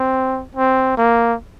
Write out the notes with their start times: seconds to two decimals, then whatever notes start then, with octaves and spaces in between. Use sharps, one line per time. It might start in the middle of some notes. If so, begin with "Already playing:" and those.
Already playing: C4
0.55 C4
0.97 A#3